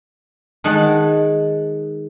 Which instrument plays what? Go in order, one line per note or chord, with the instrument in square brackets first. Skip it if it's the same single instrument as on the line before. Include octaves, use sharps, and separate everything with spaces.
[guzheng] D#3 G#3 D#5 F#5 A5